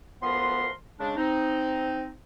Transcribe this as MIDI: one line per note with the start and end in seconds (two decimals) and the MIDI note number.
0.22 0.69 38
0.22 0.69 53
0.22 0.69 59
0.22 0.69 70
0.22 0.69 71
0.22 0.69 84
1.00 1.13 49
1.00 1.13 56
1.00 1.13 62
1.17 2.11 60
1.17 2.11 63